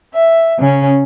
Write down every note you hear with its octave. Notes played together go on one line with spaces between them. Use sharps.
E5
C#3 C#4